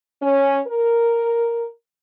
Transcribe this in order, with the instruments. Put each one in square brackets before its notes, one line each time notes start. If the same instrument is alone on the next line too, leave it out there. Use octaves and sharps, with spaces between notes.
[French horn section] C#4
A#4